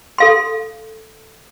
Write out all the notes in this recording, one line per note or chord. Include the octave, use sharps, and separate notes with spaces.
A4 F5 C6